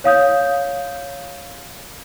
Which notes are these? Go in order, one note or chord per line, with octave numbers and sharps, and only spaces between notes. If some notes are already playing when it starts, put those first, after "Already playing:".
C#5 F5 D#6 G6